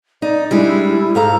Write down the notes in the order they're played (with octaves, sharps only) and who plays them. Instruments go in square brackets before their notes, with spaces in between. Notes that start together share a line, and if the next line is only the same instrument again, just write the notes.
[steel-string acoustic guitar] D#4 [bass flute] D5
[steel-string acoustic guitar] G3 G#3 D4 [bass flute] E4
[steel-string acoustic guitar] G#2 F5 A#5 [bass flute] A4